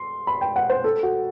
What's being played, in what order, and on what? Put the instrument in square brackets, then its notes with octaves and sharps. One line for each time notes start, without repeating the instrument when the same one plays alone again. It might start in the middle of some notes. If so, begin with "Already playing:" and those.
Already playing: [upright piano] C6
B5
G5
F#5
C5
A4
F#4